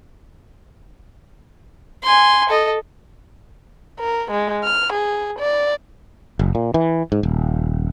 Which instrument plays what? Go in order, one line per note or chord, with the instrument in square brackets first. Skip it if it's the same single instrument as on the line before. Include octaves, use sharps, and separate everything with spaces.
[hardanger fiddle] G#5 C6
A4 D#5
[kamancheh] A#4
G#3
F6
G#4
D5
[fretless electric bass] F#1
A#2
E3
G#2
D#1